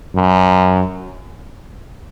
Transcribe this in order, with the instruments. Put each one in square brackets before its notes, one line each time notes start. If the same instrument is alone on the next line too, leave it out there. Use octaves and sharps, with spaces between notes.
[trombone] F#2